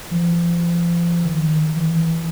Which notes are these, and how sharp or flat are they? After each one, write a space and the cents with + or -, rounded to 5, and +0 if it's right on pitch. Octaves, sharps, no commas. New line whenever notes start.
F3 -35
D#3 +0
E3 -10